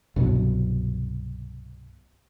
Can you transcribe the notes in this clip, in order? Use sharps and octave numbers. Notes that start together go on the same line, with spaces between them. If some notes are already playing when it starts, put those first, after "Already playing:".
C2 G2 B2 F#3